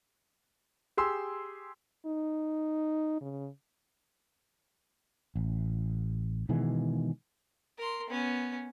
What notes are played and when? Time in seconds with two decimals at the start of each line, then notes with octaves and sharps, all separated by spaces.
0.97 G4 G#4 C6 E6
2.06 D#4
3.21 C#3
5.36 A1
6.49 B2 D#3 E3 G#3
7.78 A#4 C6
8.10 B3 C#4